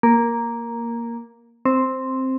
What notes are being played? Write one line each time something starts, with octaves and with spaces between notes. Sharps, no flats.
A#3
C4